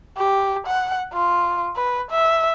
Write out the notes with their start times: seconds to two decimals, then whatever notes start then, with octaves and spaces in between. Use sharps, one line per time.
0.17 G4
0.67 F#5
1.13 F4
1.76 B4
2.11 E5